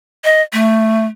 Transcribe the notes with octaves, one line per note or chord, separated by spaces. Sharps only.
D#5
A3